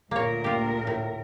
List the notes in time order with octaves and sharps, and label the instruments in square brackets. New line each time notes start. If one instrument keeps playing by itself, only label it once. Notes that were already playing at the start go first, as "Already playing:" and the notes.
[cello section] D2 A#2 A#4 [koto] A#3 C#5
[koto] F4 G4
A2